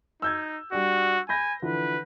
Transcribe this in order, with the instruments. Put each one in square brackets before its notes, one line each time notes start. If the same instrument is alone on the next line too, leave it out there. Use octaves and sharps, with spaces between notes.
[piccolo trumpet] D#4 [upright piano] E6 G6 G#6
[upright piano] G3 D4 [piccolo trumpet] F#4
[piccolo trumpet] G#5 [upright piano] B5 G6 A#6
[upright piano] D3 E3 F3 [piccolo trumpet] B4